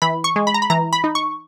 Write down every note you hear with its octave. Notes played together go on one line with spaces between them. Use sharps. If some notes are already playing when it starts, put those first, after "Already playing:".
E3 B5
C#6
G#3
B5
A#5
B5
E3 A#5
B5
D#4
C#6